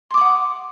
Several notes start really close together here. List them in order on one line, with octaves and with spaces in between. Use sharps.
C6 D6 D#6 F#5